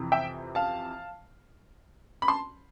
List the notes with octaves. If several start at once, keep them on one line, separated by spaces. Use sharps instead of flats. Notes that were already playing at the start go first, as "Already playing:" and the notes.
Already playing: F2 C3 E3
E5 G5
F5 A5
B5
A5 C6